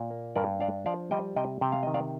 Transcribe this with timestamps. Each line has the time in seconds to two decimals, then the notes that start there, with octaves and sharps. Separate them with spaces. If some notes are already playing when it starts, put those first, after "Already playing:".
Already playing: A#2
0.11 A#3
0.36 G2 A#4 D5
0.60 D4 D5 F5
0.86 F3 D5 F5
1.11 G3 D#5 G5
1.36 C3 D#5 G5
1.61 C3 G5
1.72 F5
1.83 D#3 D#5
1.94 D5 F5